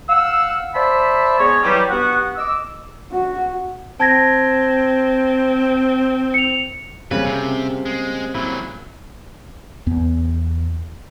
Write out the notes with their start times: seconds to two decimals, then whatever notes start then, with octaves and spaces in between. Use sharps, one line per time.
0.09 F5 F#5 E6
0.74 C5 D5 E5 A5 B5
1.39 G#3 B3 C#5
1.63 E3 F#3 G3
1.89 G2 B3 F#4 F#5
2.36 D#5 D6 E6
3.11 F#4
4.00 C4 A5 G#6 A#6
6.34 C#7 F7
7.11 C#3 G3 A#3 C4 B4
7.25 C3
7.85 G#3
8.35 A#2 F#3 E4
9.87 E2 B3